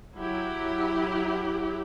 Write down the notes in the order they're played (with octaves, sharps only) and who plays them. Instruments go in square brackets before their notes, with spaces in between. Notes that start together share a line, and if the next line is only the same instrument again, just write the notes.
[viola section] F#3 E4 G4